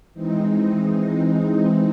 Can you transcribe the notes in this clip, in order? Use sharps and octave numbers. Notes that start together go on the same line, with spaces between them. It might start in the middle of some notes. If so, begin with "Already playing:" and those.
E3 G#3 C4 D#4